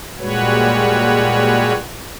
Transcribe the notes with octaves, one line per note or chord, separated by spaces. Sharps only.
A#2 G3 G#3 F#4 B4 C#5